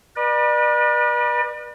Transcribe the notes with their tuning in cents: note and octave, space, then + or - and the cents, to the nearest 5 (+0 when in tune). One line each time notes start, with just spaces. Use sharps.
B4 -35 D5 +35